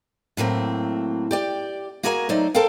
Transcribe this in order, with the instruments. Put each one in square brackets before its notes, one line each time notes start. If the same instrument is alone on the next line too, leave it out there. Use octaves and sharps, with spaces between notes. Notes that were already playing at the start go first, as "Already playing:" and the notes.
[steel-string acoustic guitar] A2 F#3 A#3 C4
G4 D5 G5
A#3 F#4 G#4 A#4 F5 G#5
F#3 A3 D#4 C5 D5
A4 A#4 C5 F5 G5